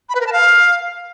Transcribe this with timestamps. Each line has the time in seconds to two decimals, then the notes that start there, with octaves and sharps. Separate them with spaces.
0.09 B5
0.15 B4
0.21 A#4
0.27 A5
0.32 F5